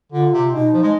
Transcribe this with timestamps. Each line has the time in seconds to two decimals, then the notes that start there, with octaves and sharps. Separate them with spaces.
0.12 D3 F4
0.32 C3
0.53 B2 D#4
0.73 F3
0.83 G#3